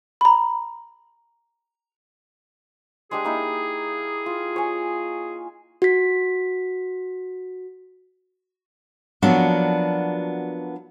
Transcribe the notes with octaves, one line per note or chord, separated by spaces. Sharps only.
A#5 B5
G#3 D4 G4 G#4
A#3 D#4 E4
F4
C#5 G#5
F#4 B6
F3 F#3 A#3 B3 D4 F#4